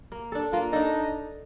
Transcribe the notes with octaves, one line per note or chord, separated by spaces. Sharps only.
A#3
D4 A4
A#3 F4
D4 D#4 A4